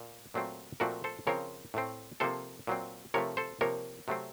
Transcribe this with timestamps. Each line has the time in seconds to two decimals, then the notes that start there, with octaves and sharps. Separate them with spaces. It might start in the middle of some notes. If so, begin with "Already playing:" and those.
Already playing: A#2
0.34 A#2 F#3 A3 C4
0.80 A#2 F3 A3 C4 F#4 A#4
1.04 A4 C5
1.27 C#3 F3 C4 A#4 C#5
1.74 A2 A3 C4
2.20 C3 F3 A#3 A4 C5
2.67 A#2 F#3 C4
3.14 C3 F3 A3 A#4 C#5
3.37 A4 C5
3.61 C3 F3 A#3 A#4 C#5
4.08 C3 F#3 A3 C4